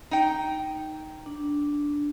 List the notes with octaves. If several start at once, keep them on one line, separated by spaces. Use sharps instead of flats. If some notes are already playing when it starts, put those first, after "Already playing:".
D#4 G5
D4